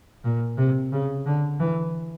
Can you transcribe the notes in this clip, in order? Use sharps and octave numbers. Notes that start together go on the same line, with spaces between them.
A#2
C3
C#3
D3
E3